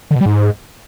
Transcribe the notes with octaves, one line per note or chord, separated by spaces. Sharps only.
D3
B2
G3
G#2